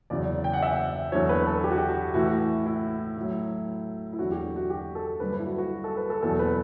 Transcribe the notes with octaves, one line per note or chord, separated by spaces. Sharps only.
E2 C#3 F#3 D5
G5
F#5
E5
F#5
E2 D3 F#3 C#5
B4
A4
G4
F#4
G4
F#4
A2 E3 F#4
E4
A2 F#3
E4
E2 D3 F#3 F#4
G4
F#4
G4
A4
G2 D3 F#3 B4
B4
E4
F#4
F#4
A4
B4
A4
E2 B2 F#3 A4
B4